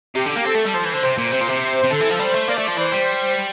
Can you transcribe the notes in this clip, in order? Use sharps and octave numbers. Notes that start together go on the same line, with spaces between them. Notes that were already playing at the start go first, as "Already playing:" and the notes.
C3 G4
D3
A#3
C4 A4
A3
G3
F3 C5
E3
D3
C3 C5
A#2
C3 C5
A#2
C3
C5
C3
D3 A4
E3
F3
G3 C5
A3
A#3 D5
A3
F3
E3 C5
G3